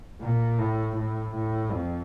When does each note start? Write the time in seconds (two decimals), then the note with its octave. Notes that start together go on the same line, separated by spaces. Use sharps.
0.21 A#2
0.58 A2
0.96 A2
1.34 A2
1.71 F2